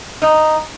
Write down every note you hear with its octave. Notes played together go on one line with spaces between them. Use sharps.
D#4